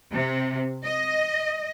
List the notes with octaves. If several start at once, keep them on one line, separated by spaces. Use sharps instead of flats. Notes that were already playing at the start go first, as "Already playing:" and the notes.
C3
D#5